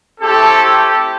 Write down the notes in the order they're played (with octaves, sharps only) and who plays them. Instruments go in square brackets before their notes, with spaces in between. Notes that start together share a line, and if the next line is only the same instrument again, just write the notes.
[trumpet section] A3 C4 E4 G4 A4
G4